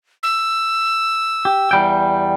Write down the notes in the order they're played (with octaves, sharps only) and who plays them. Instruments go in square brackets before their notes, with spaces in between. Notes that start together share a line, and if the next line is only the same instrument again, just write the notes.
[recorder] E6
[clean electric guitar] G4
E2 G3 G5